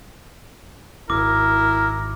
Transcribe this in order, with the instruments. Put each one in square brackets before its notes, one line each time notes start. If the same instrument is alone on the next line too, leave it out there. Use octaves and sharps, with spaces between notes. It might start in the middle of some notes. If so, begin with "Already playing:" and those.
[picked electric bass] D1 G#1 [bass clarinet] E4 [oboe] A#4 [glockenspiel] D6